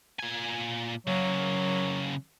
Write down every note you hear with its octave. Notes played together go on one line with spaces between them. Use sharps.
A#2 G#5
C#3 F#3 A#3